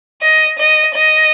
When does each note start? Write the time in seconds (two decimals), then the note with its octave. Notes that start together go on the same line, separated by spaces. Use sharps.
0.22 D#5
0.58 D#5
0.95 D#5